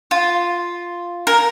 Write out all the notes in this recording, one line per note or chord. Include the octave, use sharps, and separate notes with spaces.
F4
A#4